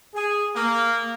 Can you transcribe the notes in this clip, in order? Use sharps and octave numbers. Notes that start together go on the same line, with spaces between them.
G#4
A#3